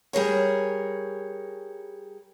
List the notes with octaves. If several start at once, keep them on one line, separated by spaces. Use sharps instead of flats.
G3 G#4 A#4 C#5